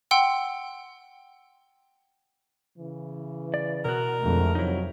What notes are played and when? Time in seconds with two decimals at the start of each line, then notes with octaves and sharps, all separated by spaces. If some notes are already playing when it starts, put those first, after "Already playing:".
0.11 F#5 G5 C6 E6
2.78 C#3 E3
3.54 D5
3.85 B2 F#4 A#4
4.22 F2 D3 G#3 A3
4.55 C3 F3 F#3 D#4 E4